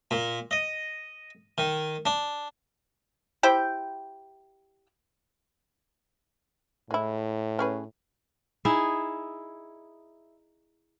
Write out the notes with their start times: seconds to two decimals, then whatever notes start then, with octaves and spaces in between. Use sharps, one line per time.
0.11 A#2
0.51 D#5
1.58 D#3
2.06 D4
3.43 E4 G4 C5 G5
6.91 A2 G#3 E4
7.59 C#4 G#4 B4
8.65 D#4 E4 G#4